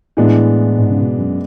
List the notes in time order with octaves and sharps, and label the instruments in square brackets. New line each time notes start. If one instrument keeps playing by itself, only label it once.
[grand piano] A2 [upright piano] E3 G#3 B3 D4
[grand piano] G#2
C#3
B2
F#2